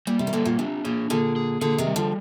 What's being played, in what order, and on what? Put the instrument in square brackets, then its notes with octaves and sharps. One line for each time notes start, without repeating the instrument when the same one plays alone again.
[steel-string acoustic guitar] A#2 [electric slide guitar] G3
[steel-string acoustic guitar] C3
D#3
[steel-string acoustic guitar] A#2 D3 [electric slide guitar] F4
[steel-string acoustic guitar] A#2
[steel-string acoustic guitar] C3 [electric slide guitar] D4
[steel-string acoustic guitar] A#2 [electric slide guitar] G#4
[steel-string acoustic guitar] A#2 D3 [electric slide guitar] G#4
[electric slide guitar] G#4
[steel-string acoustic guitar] A#2 D3 [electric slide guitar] G#4
[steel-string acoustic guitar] C3 D#3
[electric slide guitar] G3
[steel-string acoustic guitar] D3 F3